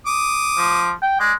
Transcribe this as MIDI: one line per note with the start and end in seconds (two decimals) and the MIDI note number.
0.07 0.90 86
0.07 0.90 87
0.58 0.92 53
1.03 1.17 79
1.20 1.33 56
1.20 1.32 74